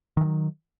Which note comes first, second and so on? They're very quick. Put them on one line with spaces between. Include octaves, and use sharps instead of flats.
D#3 E3 F#3